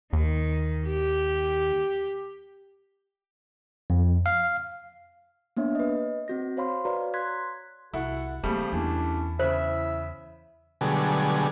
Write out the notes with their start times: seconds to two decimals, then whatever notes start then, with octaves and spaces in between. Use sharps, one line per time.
0.13 D#2 D#3
0.86 G4
3.90 F2
4.26 F5
5.57 A#3 B3 D4 C#5 E5
5.75 B4 D#5
6.28 C4 F#4 A#6
6.57 C5 C#5 F5 B5 C6
6.85 F#4 B4 C#5 D5 F5 A#5
7.14 C6 F#6 G#6 B6
7.93 C2 E4 F#4 A4 F#5
8.43 C#3 F3 G3 A3 A#3 C4
8.72 E2 C#4 D4 E4
9.39 C#3 E4 C5 E5
10.81 B2 D3 F#3 G3 A3 G#4